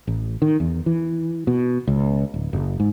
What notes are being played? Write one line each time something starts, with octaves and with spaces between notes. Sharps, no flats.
A1
D#3
E2
E3
B2
C#2
D1
F#1
G#2